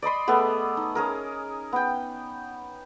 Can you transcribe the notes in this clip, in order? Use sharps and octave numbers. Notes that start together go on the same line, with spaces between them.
D5 D#5 B5 C6
A3 B3 G#4
D#4
C#4 G#4 A#4
B3 G5